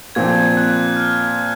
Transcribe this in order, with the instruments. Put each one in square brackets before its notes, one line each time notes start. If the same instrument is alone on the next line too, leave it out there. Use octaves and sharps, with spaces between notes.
[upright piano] A#2 F3 C4 [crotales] G#6
[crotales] F#6
F6